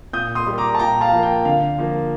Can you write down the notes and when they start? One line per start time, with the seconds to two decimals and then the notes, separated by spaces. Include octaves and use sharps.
0.13 A#2 D#6 G6
0.35 C6 D#6
0.47 G3 A#3
0.58 A#5 D6
0.75 A5
0.79 A#2 G5 A#5
1.01 F5 A5
1.12 F3 A#3
1.23 G5
1.45 D3 F5
1.78 F3 A#3